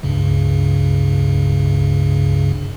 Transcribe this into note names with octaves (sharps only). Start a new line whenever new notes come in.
C#2 G2 C#3